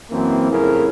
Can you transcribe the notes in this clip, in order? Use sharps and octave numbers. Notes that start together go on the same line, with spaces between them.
F#2 E3 A#3 C4
F2 A2 C#3 E4 A#4